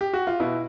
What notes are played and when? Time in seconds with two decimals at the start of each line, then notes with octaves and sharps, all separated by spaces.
0.01 G4
0.14 F#4
0.27 F4
0.40 B2 E4